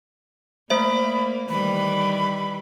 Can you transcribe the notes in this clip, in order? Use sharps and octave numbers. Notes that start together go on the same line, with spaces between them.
A3 A#3 C5 E5 B5
D#3 E3 G3 B5